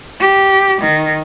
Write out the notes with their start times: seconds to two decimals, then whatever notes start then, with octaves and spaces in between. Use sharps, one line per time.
0.21 G4
0.82 D#3